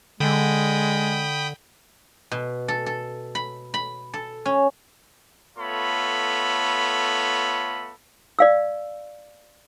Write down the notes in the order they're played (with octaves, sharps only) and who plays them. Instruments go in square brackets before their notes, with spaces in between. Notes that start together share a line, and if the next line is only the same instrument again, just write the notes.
[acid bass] D3 [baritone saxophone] G#3 [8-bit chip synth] G5 B5 D#6
[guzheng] B2
A4
A4
B5
B5
A4
C#4
[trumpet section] A3 B3 F4 A4 C#5 B5
[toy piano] D5 F5 E6